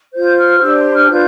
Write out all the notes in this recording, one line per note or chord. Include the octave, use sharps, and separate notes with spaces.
F4 C5 G6
F6
D4 G4 C5 E6
C6
F6
D4 F4 B4 G6